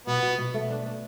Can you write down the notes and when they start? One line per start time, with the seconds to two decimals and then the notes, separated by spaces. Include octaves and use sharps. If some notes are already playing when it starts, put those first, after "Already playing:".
0.07 B2 B3
0.23 B2
0.38 B2
0.54 A3
0.70 D4
0.86 D4